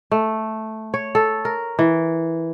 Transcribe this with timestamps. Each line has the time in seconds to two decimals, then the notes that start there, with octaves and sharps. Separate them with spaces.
0.11 A3
0.94 C#5
1.15 A4
1.45 A#4
1.79 E3